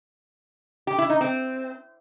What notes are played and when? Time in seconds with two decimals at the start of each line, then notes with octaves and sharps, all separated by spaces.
0.87 G4
0.98 E4
1.10 D#4
1.21 C4